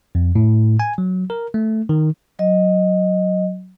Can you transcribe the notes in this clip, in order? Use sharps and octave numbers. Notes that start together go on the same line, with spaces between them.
F2
A2
G#5
F#3
A#4
A3
D#3
F#3 D#5